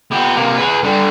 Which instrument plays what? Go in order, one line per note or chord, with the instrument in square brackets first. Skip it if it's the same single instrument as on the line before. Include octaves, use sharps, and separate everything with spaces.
[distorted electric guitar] B3 G4
C3 A#3
G#4 B4
D3 G3